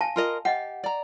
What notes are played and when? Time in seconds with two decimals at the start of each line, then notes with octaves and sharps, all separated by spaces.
0.01 F5 G#5 A5
0.16 F4 A#4 D#5
0.45 G4 D#5 F#5
0.84 D5 A#5